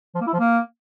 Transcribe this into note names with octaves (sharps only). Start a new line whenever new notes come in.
F3
A#3
E4
F3
A#3